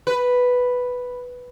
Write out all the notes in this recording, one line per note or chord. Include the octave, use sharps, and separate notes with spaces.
B4